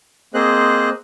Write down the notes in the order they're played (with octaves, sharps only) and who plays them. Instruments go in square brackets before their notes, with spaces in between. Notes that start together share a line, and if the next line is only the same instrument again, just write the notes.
[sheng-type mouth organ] A#3 C4 G#4 C5 D#5 F#6